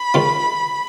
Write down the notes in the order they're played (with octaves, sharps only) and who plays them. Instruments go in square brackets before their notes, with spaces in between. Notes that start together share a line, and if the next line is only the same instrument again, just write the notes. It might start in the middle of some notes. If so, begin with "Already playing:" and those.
Already playing: [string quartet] B5
[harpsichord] D#3 G#3 C#4 F4